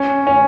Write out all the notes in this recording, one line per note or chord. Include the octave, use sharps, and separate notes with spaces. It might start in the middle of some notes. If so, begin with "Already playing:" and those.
Already playing: C#4
C#4